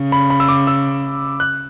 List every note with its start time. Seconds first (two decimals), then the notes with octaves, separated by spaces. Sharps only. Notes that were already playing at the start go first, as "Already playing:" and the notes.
Already playing: C#3
0.12 B5
0.30 B5
0.40 E6
0.49 D6
0.67 E6
1.40 F#6